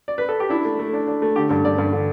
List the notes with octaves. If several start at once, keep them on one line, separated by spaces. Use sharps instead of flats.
D5
B4
A4
G4
D4 E4
A3
A3
D4
D4
A3
D3 G4
G2 A4
G2 D5
G2
D3